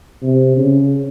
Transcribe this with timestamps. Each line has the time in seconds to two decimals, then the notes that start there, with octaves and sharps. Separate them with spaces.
0.22 C3
0.57 C#3